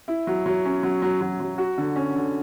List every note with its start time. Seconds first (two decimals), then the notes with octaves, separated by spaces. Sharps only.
0.08 E4
0.27 F#3
0.46 F#3
0.65 C#4
0.83 F#3
1.02 F#3
1.21 F#3
1.40 F#3
1.58 F#4
1.78 D3
1.96 C#4
2.15 D3